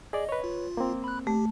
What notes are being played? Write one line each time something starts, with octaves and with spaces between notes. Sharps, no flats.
G#4 D5 D#5
B4 C#5
F4
A#3 C4
B5 F#6
A3 G4